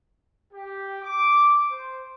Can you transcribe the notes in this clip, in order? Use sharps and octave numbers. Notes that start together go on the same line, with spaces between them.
G4
D6
C5